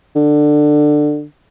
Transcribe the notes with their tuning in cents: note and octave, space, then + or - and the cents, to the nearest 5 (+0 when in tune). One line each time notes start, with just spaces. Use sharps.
D3 +15